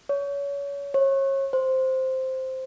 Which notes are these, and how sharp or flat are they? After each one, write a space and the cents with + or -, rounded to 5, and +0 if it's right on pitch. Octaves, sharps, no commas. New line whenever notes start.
C#5 +30
C#5 -30
C5 +0